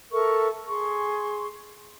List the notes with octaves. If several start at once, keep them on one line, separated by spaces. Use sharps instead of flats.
A4 A#4 E5 C#6
G#4 C6 C#6